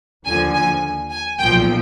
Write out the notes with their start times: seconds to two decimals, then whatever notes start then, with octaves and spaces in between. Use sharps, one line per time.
0.25 D#2 D3 F3 G#5
0.54 G#5
1.11 G#5
1.39 B1 A#2 F3 G5